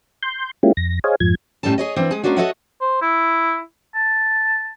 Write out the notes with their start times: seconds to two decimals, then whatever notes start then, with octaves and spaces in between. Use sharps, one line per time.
0.23 C6 G6
0.63 G#3 A#3 C#4 E4 F4 G4
0.77 F2 A#6
1.04 G#4 C5 C#5 D#5 F5 G#5
1.20 F2 G#2 F3 G#6
1.63 F#2 A2 G3 C#4 A4 A5
1.78 G#4 C#5 D#5
1.96 E3 B3 C4 D4
2.11 G#3 G#4
2.24 G#3 A#3 C#4 D4 F#4
2.37 F#4 A4 C#5 D#5 E5 F#5
2.81 C5
3.02 E4
3.95 A5